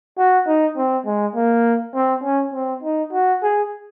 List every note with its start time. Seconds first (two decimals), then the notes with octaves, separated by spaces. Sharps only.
0.18 F#4
0.47 D#4
0.77 C4
1.06 G#3
1.35 A#3
1.95 C4
2.24 C#4
2.54 C4
2.83 D#4
3.13 F#4
3.42 G#4